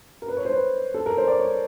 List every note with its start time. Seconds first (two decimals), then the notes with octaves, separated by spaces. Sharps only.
0.22 A#4
0.28 B4
0.37 C#5
0.45 C5
0.52 B4
0.94 A4
1.06 A#4
1.17 C5
1.28 D5
1.39 C#5